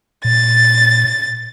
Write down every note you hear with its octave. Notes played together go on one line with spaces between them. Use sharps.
A#2 A6